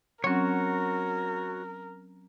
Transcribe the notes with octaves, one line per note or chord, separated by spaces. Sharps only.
F#3 C4 C#4 F#4 A#4 C#5